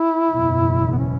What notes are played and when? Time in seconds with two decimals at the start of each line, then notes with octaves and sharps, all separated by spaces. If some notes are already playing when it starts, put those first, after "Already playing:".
Already playing: E4
0.31 F#1 E2 B2
0.92 B3
0.98 C#4